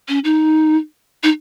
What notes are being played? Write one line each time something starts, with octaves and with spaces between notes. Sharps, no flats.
C#4
D#4
D#4